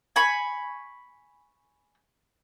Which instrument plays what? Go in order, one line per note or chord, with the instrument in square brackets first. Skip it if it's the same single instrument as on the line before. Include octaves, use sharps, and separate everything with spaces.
[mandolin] G#5 B5 C#6